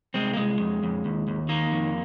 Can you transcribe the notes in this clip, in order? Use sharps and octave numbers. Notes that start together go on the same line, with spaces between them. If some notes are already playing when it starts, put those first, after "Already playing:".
C2 G#3 C4
A#3
C2 G#3
F2
F2
D#2
D#2
D#3 A#3
F2